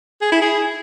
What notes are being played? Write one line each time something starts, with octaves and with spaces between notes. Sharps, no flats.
G#4
E4
G#4